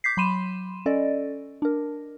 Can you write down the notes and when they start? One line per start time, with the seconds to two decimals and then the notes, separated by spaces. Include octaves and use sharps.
0.04 D6 G6 B6 C7
0.17 F#3 B5 C6 D#7 E7
0.86 C#4 A4 D5 D#5
1.62 D4 A#4